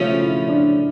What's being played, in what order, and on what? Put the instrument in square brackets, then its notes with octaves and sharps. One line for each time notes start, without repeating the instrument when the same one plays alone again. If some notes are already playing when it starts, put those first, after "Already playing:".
Already playing: [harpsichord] C#3 F3 A3 C#4 [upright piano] F4
[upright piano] E4
D4